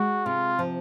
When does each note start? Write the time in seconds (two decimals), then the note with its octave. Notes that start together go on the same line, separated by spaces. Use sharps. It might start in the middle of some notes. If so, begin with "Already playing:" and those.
Already playing: G#3 F#4
0.26 C3 F4
0.59 F3